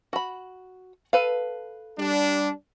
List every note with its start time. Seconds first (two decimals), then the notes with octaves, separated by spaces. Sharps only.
0.13 F#4 B5
1.13 A4 B4 F5
1.98 G3 D4